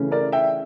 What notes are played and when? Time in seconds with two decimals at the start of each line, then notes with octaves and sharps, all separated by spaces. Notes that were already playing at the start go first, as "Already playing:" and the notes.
Already playing: C#3 E3 A3 C#4
0.11 A#4 D5
0.32 E5 G5